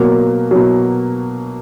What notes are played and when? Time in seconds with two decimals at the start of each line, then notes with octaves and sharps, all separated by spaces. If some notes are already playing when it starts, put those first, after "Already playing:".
Already playing: B2 F#3 A#3
0.51 B2 F#3